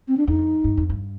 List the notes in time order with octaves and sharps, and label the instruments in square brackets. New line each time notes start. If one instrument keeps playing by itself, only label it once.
[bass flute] C4
D4
[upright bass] F2 [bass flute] D#4
[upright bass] G2
F2
G2